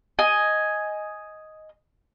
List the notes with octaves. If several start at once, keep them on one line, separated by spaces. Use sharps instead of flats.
D#5 G#5